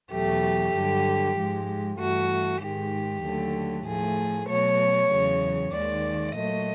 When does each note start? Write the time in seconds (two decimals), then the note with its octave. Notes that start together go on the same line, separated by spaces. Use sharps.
0.10 E2 B2 F#3 A3 G4
0.73 G2 D3 F#3
1.36 G#2 F3 G#3
1.98 G2 E3 A3 F#4
2.60 G#2 D#3 G#3 G4
3.22 D#2 D3 F#3 A3
3.85 A2 F3 A3 G#4
4.47 B2 F#3 A3 C#5
5.10 E2 C#3 F#3
5.72 D#2 D#3 G#3 D5
6.34 A#2 F#3 A3 D#5